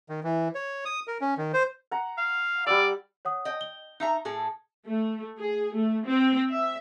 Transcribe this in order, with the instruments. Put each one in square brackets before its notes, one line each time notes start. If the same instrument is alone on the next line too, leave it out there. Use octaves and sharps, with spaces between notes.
[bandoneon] D#3
E3
C#5
D#6
A#4
C#4
D#3
C5
[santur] F#5 A#5
[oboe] F5
[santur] G3 F#5 E6 [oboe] D5
[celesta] C#5 F#5 D#6
[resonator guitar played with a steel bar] D#5 G5
[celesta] G7
[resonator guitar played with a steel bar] D#4 E5 A#5
A2 G#4 A4
[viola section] A3
G#4
A3
C4
E5